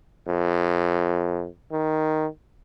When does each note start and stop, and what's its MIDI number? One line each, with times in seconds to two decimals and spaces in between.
0.28 1.48 41
1.72 2.27 51